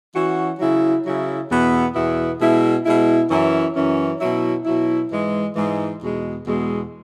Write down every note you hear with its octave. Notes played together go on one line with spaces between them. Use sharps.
E3 C#4 F#4
C#3 F#3 E4
C#3 F#3 E4
E2 B2 B3 E4
E2 B2 B3 E4
B2 G#3 E4
B2 G#3 E4
F#2 E3 C#4 E4
F#2 E3 C#4 E4
B2 F#3 E4
B2 F#3 E4
G#2 E3 G#3
G#2 E3 G#3
E2 B2 G#3
E2 B2 G#3